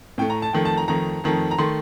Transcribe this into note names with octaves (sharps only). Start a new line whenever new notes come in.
A2 A3 G5
A#5
A5
F2 D#3 A3 G5
A5
A#5
F2 D#3 A3 A#5
F2 D#3 A3
A#5
D#3 A3 C6